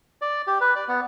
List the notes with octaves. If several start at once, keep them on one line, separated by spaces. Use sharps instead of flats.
D5
G4
B4
D5
B3